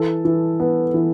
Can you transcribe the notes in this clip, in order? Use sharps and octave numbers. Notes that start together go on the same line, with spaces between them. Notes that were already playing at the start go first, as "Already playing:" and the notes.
Already playing: E3 A4
E3
B3
E3